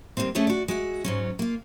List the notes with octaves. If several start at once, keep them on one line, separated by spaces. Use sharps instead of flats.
D#3 F3 G3 A#3 C4
A3 C#4 G#4 A4 C#5
F#4 D5
G#3 F#4 E5
G#2 F#3 C#4
A#3 F4